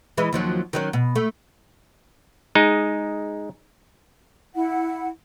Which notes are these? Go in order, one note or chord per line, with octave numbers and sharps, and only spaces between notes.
E3 G#3 E4
D#2 F3 F#3
D#3 F#3 C#4
B2
A3
G#3 D#4
E4 F#5